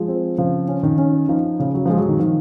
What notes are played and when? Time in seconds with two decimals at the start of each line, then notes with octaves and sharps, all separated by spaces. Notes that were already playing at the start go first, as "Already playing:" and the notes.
Already playing: F3 G#3
0.08 C4
0.38 C#3 F3
0.68 C#4
0.83 D#3
0.98 C#4
1.29 F3 D#4
1.60 C#3
1.74 F#3
1.86 F3 G#3
1.97 F#3
2.09 D#3
2.19 D#3 F3